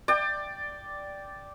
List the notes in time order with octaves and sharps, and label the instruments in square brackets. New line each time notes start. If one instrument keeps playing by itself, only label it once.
[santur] D5 G5